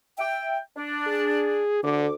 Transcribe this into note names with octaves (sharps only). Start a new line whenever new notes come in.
E5 G5
D4
G#4
D2 D3 D6